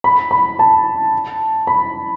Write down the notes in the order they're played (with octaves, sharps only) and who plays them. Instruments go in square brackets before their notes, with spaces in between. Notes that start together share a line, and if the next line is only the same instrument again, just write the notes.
[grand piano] B5
B5
A5
B5